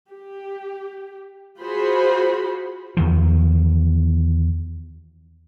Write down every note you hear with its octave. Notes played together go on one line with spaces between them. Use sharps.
G4
F4 F#4 G#4 C5 B5
E2 D#3 F3